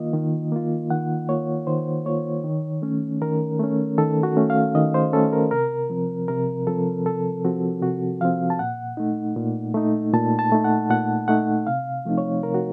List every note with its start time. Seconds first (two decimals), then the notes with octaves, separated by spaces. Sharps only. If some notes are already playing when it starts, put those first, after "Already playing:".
Already playing: D#3 A#3 F4 D#5
0.13 D#3
0.52 A#3 F4
0.90 D#3 F#5
1.29 A#3 F4 C#5
1.67 D#3 C5
2.06 A#3 F4 C#5
2.44 D#3
2.82 A3 C#4
3.21 D#3 A#4
3.59 A3 C#4
3.98 D#3 A4
4.23 F#4
4.37 A3 C#4
4.50 F5
4.75 D#3 D#5
4.94 C5
5.13 A3 C#4 A4
5.33 A#4
5.51 C3 A#4
5.90 F3 C4
6.28 C3 A#4
6.67 F3 C4 A4
7.05 C3 A4
7.45 F3 C4 F#4
7.82 C3 F#4
8.21 F3 C4 F5
8.50 A5
8.59 A#2 F#5
8.97 A3 D#4
9.36 A#2
9.74 A3 D#4
10.13 A#2 A5
10.39 A5
10.52 A3 D#4
10.64 F#5
10.89 A#2 F#5
11.28 A3 D#4 F#5
11.67 C3 F5
12.05 F3 A3 C4 D#4
12.18 C#5
12.43 C3 A#4
12.54 F#4